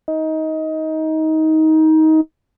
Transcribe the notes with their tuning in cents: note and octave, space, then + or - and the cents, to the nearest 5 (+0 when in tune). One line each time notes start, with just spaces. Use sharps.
D#4 +20